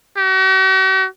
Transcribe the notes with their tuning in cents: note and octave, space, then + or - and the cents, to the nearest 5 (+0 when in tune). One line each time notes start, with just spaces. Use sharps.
F#4 +45